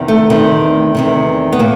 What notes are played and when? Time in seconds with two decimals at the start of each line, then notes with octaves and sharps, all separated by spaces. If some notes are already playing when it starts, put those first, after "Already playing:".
Already playing: E2 C3 D#3
0.08 A3
0.30 E2 C3 D#3
0.95 E2 C3 D#3
1.53 B3
1.59 A2 A#3